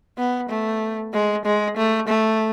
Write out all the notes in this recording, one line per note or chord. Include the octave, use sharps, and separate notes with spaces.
B3
A3
G#3
G#3
A3
A3